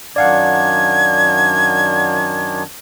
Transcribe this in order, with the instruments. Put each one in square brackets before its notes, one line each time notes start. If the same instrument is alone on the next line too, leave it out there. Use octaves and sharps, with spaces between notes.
[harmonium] F#2 D#3 D4 [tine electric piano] D5 F5 F#5 [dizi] G#6